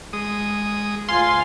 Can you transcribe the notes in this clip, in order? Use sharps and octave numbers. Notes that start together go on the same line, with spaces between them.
G#3 D#6
D2 F4 F5 G#5 C6